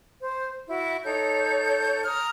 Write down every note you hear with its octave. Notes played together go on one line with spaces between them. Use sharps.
C5
E4 F#4
D#4 A4 C#5 G6
A#5 D#6 F6